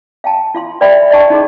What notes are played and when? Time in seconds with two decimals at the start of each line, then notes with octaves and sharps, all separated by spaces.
0.24 F5 G5 A5
0.55 F4 F5 C6
0.81 B4 D5 E5 G5 B5
1.10 D5 D#5 G5 A5 C#6
1.30 D#4 F#4 G#4